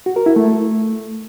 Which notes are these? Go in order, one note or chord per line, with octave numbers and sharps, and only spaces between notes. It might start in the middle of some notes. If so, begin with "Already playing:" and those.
F#4
A#4
E4
A3